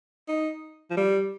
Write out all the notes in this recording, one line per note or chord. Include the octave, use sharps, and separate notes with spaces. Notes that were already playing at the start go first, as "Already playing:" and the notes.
D#4
F3
G3